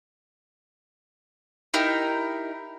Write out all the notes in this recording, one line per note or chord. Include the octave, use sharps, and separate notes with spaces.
D#4 E4 G4 A#4